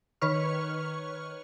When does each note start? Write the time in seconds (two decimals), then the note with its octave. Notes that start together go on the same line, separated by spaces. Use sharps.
0.21 D#3 B4 C#5 C#6 F6